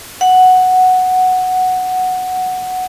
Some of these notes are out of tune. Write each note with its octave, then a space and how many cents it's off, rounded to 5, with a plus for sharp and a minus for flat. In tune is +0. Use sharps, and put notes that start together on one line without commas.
F#5 +0